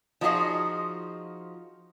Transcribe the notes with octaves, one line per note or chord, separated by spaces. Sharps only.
F3 D#4 F4 F#4 G#4 D#5